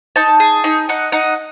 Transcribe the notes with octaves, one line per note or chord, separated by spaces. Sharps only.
D#4 A5
G#4
D#4
D#4 F#5
D#4 F#5